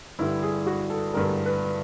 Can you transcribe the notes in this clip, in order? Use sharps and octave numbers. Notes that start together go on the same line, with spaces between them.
G2 D3 G3 E4
G#4
F#4
A4
G2 D3 G3 A#4
B4